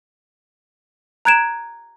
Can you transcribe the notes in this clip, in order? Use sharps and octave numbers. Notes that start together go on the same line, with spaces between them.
A#5 F#6 G#6 D7 E7